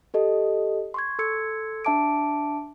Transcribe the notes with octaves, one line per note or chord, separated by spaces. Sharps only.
G4 A4 D#5
C6 C#6 G#6
A4 C6 E6 G#6 C#7
D4 E5 A5 D6 D7